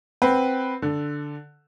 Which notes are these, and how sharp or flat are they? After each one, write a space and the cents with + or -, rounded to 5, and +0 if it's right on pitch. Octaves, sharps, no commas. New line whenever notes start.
C4 +0 B4 +0 F#5 +0
D3 +0 A4 +0